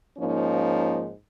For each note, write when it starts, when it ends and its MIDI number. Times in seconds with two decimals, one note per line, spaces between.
0.18 1.10 44
0.18 1.10 53
0.18 1.10 58
0.18 1.10 61
0.18 1.10 63